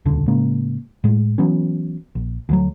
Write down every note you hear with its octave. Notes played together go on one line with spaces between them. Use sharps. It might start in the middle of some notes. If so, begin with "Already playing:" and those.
D#1 C#2 D3
A2 C#3 G#3 A#3
A2 G#3
E3 F#3 B3 C#4
A#1
D2 E3 F#3